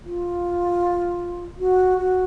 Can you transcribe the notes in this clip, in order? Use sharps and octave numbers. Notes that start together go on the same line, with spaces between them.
F4
F#4
F#4